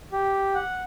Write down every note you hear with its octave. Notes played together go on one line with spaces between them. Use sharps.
G4
F#5